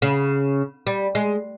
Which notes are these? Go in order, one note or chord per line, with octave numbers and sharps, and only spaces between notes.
C#3
G3
G#3